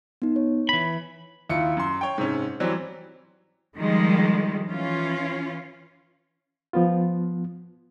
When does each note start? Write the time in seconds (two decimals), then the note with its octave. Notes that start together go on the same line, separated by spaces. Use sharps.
0.22 B3 D#4
0.36 C#5
0.69 E3 B5
1.50 D#2 E4 F4 C#7
1.77 F#2 C6
2.01 C#5 G5
2.18 G#2 C3 C#4
2.60 E3 F#3 G3 C4
3.76 D#3 F3 G3 G#3
4.69 E3 C#4 F4
6.73 F3 B3 F4